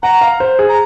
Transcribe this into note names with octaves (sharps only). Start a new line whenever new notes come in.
F#5 A#5
F5
C5
G#4
A#5